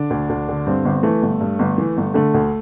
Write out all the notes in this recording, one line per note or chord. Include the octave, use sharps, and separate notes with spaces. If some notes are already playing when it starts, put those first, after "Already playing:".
Already playing: D3 D4
D2
D2
D3
G2 C4
G1
E3 A3
G1
G2
G1
E3
G1
D3 A3
D2